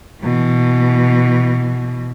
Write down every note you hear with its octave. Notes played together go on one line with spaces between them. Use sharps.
B2 E3